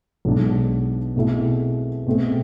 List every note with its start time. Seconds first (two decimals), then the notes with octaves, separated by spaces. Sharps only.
0.25 B1 B2 G#3 D4
1.16 B2 A3 C4 E4 G#4
2.07 B2 A3 C4 G#4